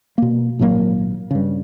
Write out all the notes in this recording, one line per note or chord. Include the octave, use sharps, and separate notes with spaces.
B2 A#3
G#1 A#2 F#3 A#3
G2 C#3